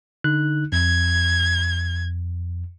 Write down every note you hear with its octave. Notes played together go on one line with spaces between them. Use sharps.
D3 D#4 F#6
F2 G#6